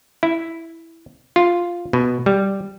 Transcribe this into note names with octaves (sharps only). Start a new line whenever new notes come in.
E4
F4
B2
G3